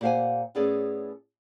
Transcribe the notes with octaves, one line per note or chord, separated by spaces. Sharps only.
A#2 G4 C5 F5 F#5 G#5
A2 B3 C#4 G#4 A4 D5